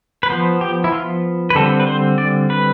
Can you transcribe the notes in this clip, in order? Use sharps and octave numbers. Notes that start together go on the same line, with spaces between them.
B4
F3 B3 C5
G4
E4
F4
B4
D3 G3 C4 A4
B4
C5
D5
B4